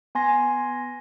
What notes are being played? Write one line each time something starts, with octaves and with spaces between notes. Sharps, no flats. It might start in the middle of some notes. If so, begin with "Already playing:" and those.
B3 G#5 C6 A#6